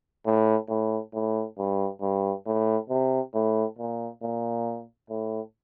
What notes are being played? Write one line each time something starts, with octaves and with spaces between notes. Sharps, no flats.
A2
A2
A2
G2
G2
A2
C3
A2
A#2
A#2
A2